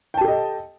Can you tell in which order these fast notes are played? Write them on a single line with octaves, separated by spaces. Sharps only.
G5 A5 G4 A4 D#5